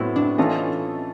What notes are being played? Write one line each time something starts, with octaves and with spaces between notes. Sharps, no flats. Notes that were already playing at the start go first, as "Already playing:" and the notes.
Already playing: A2 F#3 B3 C4 E4
D4
E3 A3 C#4 D#4 F4 A4